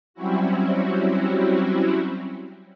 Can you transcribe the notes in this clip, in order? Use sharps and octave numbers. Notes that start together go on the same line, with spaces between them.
F#3 G3 C4 C#4 E4 F#4